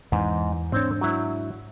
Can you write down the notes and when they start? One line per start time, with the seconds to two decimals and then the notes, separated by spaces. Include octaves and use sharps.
0.12 E2 G#2 E3
0.72 G#2 C4 D4 C5 C#5
1.01 F#3 E4